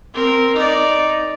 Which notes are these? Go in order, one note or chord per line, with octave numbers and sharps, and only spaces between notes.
C4 A#4
D#4 D5